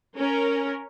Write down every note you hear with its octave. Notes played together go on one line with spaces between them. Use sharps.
C#4 A#4